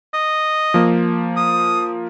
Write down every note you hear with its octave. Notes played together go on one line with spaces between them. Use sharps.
D#5
F3 A#3
D#6